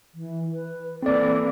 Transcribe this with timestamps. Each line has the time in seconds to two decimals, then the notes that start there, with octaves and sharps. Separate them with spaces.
0.14 E3
0.52 B4
1.03 E3 A#3 C4 A4 D5